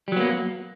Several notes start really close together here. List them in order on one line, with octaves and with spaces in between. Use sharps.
G3 F#3 B3 A#3